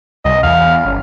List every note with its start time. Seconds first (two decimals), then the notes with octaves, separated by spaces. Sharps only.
0.25 C2 D#5
0.43 E2 F5
0.85 G1 C#4